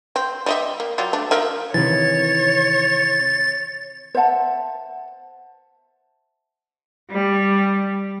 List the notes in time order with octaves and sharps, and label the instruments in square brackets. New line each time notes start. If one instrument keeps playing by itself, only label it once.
[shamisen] C4
G3 D#5 E5
A#3
F#3 G3 F4
A3 D4
F3 A#4 E5
[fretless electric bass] C3 D#3 E3 [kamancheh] C#5 [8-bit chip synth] A6
[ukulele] C5 E5 F#5 A5
[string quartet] G3